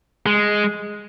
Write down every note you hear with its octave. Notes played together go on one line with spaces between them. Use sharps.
G#3